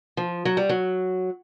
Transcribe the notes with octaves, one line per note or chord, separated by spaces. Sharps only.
F3
F#3
G3
F#3